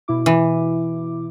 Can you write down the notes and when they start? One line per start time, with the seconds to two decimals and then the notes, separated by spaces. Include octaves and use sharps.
0.08 B2 E4 D6
0.26 E3